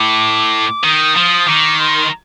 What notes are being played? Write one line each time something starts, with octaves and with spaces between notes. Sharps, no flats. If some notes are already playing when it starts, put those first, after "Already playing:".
Already playing: A2 D6
D#3 D#6
F3
D#3 D6
C6